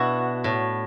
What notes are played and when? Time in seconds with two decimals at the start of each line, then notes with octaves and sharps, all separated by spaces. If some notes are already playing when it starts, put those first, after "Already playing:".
Already playing: B2 D4 E4 F#4
0.44 A2